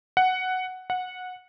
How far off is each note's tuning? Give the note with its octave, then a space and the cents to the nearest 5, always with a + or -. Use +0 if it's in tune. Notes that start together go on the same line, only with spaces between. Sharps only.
F#5 +5
F#5 -15